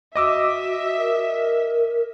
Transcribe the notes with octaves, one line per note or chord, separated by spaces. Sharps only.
F#4 D#5 E5 D6 E6
A#4